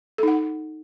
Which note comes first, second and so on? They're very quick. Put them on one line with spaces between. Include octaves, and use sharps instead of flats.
A4 D#4 F#5